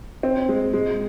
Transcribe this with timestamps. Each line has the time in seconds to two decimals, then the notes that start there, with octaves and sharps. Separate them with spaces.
0.23 C4
0.49 G#3
0.74 G#3